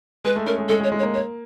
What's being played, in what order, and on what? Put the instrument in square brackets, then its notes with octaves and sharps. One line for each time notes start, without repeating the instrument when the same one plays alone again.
[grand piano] G#3 [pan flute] B4
[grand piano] A3
[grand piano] C#4 [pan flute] A#4
[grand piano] G#3
[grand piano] G#3 [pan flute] A4
[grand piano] G#3
[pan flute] C#5
[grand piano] G#3
[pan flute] C#5
[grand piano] A#3
[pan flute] C#5